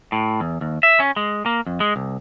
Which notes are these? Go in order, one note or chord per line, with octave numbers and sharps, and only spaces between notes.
A2
E2
D#2
E5
C#4
G#3
A#3
F2
G#3
C2